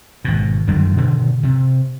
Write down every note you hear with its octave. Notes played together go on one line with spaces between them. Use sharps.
G#1 B2
F#2 D3 D#3 G3
B2 D3 D#3
C3